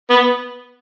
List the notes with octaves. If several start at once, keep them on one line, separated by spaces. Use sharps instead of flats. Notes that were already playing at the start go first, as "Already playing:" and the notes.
B3